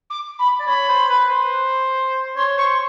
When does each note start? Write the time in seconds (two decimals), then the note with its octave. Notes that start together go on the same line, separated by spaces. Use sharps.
0.10 D6
0.39 B5
0.60 D5
0.67 C#5 B5
0.89 C5
1.09 B4
1.31 C5
2.37 C#5 C6
2.58 C5 C#6